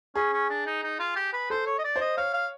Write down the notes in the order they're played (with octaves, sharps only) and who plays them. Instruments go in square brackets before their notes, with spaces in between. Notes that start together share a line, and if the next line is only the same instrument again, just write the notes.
[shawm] C#4 [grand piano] G#4
[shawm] C#4
D4
D#4
D#4
F4
G4
B4
[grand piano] A4 [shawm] C5
[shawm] C#5
D#5
D5
[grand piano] C5
[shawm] D#5
[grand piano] C#5 [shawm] F5
[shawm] F5